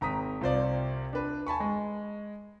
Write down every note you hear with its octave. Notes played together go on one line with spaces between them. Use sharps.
G#1 A#5 D#6 B6
C2 F4 C5 D5
D4 B4
G#5 A5 B5 C#6
G#3